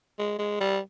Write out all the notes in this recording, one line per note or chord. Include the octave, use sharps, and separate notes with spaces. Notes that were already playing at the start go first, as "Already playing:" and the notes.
G#3
G#3
G3